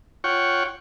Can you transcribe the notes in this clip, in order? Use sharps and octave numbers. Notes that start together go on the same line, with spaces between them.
F4 C#5 F#5 G5 C#6